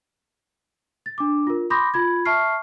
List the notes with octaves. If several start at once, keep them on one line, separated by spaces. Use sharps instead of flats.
A6
D4 D6
F4 A#4
B5 C6 D6 D#6 G6 A#6
F4 B5 G#6
E5 A5 C#6 F6 C7